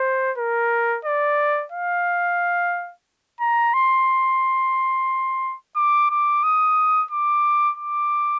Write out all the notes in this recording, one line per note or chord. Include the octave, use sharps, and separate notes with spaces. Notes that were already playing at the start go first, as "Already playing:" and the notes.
Already playing: C5
A#4
D5
F5
A#5
C6
D6
D6
D#6
D6
D6